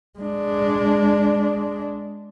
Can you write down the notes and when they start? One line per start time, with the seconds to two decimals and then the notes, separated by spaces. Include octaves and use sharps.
0.19 G#3 D4